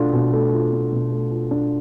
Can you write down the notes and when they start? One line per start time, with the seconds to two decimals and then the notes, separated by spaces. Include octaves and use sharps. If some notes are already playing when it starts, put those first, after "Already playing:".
Already playing: B2 A3 D4 F4
0.13 B2
0.33 A3
0.53 F4
0.73 D4
0.93 B2
1.12 A3
1.31 F4
1.51 D4